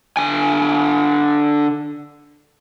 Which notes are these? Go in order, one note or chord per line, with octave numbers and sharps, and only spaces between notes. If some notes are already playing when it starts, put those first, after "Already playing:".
D3 G#5